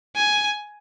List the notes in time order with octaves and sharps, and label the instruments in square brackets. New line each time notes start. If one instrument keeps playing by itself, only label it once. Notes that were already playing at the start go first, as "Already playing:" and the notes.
[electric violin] G#5